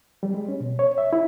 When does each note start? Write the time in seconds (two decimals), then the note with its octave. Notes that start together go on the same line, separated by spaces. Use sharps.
0.23 G3
0.34 G#3
0.48 C#4
0.60 B2
0.79 C#5
0.98 E5
1.13 E4